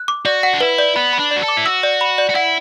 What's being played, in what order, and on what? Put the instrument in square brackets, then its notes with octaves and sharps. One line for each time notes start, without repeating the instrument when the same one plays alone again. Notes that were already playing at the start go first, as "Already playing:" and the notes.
Already playing: [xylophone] F#6
D6
[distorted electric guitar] F#4 [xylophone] D5
[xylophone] F#5
[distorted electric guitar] D4
[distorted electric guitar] E4 [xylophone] B4
[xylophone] D5
[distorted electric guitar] B3 [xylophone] B5
[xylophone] B5
[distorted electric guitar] D4
[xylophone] D5
[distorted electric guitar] F#4
A4
[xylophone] D6
[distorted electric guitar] E4
[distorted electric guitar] F#4 [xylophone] E6
[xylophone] D5
B5
D5
[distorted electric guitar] F#4
[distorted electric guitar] E4 [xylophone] F#5